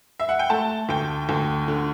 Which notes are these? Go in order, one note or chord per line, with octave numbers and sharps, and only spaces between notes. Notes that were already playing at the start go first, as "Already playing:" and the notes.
E5
F#5
G5
A3 A5
D2 G5
D2
D3